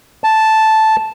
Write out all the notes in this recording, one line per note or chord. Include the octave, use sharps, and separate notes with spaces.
A5